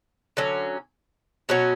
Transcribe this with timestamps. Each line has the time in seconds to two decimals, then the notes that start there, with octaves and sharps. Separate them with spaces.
0.37 D3 F#3 C#4
1.49 B2 F#3 C#4 F#4